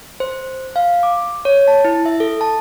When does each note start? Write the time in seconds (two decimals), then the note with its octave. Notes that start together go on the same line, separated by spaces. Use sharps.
0.20 C5
0.76 F5
1.03 D6
1.45 C#5
1.68 A5
1.85 E4
2.06 E5
2.20 A4
2.41 A5